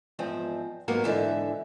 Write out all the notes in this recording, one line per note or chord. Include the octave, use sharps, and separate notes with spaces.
E2 G#2 F3 C4
G#2 F#3 A#3 B3
G#2 D3 E3 E5